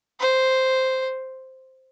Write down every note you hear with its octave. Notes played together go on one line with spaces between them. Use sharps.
C5